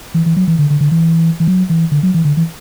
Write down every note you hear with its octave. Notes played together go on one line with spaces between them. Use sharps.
E3
E3
F#3
E3
D3
D3
D3
E3
E3
F#3
E3
D3
F#3
E3
D3
E3